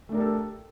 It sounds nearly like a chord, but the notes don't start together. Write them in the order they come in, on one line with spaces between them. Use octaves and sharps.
A3 D4 A#4 G4 A4